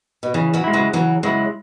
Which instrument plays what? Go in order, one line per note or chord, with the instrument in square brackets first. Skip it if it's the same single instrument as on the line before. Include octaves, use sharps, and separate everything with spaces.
[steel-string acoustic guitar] B2
[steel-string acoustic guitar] C#3 [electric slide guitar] E3
[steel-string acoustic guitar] C#3 F#3
[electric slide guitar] G#3 E4
[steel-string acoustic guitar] C#3 F#3
[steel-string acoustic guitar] C#3 F#3 [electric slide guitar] E3
[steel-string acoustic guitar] C#3 F#3 [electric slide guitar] G#3 E4